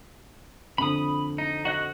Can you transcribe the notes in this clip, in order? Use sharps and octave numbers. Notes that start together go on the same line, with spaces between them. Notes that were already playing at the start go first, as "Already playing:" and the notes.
F2 D3 B5 D#6
D#4
F#4 D#5 F#6